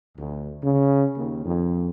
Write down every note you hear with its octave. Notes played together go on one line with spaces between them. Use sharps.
D2
C#3
D#2
F2